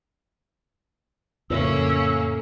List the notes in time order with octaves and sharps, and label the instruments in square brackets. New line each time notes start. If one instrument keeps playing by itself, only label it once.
[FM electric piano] F2 C#3 [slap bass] A2 [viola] A#3 C#4 [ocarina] E6